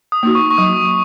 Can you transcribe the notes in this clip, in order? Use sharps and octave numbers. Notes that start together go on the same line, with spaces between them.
D#6
A#3 D#4 F#4
C#6
C#6
F#3 D#6